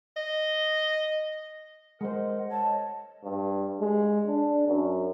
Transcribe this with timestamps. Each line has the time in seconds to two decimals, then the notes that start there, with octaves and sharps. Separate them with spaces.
0.17 D#5
2.01 G#3 A#4 C5 D#5 F#5
2.51 C#5 D#5 A5
3.23 G2
3.80 G#3
4.27 D4
4.68 F#2